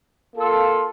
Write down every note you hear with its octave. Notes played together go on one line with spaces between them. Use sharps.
A#3 F4 A4